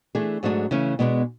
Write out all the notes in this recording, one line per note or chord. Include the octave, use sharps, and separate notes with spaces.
E3 A3 D4 G#4
G#2 F#3 A3 D4 G#4
C#3 E3 A3 C#4
B2 G#3 B3 D4